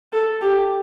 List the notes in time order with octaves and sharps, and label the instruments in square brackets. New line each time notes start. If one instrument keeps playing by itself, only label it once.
[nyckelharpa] A4
G4